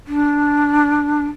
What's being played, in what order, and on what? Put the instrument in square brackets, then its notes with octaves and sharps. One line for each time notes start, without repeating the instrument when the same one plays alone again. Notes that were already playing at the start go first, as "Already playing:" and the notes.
[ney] D4